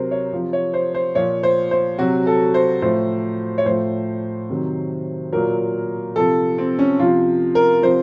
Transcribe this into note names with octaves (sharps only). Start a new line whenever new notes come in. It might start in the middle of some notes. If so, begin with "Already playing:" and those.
Already playing: C3 F#3 A#4 C5
C#5
C3 F3
C#5
C5
C5
A#2 F3 C#5
C5
C5
C3 F#3 F#4
A4
C5
A2 F3 C5
C#5
A2 F3 C5
C3 D#3 F#3
A#2 F#3 A#4
C3 F3 A4
C4
C#4
C3 F3 F4
A#4
C3 F3 C5